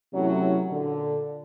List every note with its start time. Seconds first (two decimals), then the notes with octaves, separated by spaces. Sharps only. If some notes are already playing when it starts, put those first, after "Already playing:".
0.13 A2 C3 E3 F#3 C#4
0.70 A#2 D3